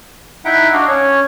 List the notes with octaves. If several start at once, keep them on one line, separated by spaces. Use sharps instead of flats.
D#4 E4 E5 F#5 G5
D4 F#4 D#5 F5
C#4 C#5